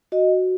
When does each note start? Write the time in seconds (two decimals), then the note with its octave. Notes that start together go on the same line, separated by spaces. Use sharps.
0.12 F#4 D#5